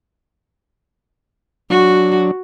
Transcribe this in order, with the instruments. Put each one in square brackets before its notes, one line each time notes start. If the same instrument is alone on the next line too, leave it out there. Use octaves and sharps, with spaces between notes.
[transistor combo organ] F#3 D4 [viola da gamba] F#4